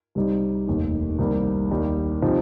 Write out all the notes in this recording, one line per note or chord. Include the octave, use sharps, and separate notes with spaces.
C2 C3 G3 D#4
F1 D#2 D#3
C2 C3 D#3 G3 A#3
D#2 D#3 G3
C3 F3 C4 D#4